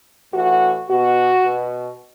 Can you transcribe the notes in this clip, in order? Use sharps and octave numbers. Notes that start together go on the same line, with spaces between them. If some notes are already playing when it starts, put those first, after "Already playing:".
A2 E3 F#4
B2 F#4
B2